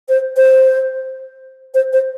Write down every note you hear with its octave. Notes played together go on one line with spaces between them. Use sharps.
C5
C5
C5
C5